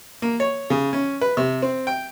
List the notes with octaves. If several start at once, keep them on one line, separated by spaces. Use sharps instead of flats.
A#3
C#5
C#3
C#4
B4
C3
C4
G5